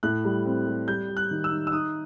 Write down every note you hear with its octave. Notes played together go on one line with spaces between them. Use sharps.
A2 F#6
G3
C4
G3
G3 G6
G3
F#6
D#3
E6
D#4
E6
D#4 D#6